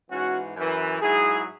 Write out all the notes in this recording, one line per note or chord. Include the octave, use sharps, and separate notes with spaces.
G#2 E3 C#4 F#4
F#2 E3
G#2 F#3 E4 G#4